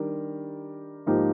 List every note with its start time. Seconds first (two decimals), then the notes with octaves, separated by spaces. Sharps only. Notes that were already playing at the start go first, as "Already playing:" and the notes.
Already playing: D#3 G3 D4 G4 A#4
1.06 G#2 F3 A#3 D#4 G4